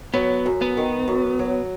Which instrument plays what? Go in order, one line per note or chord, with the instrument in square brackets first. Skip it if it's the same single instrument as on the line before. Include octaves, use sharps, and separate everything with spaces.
[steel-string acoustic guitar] F#3 [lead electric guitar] B3
[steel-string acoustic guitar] F#2
[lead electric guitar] B3
[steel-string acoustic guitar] D#3
F#2
F#3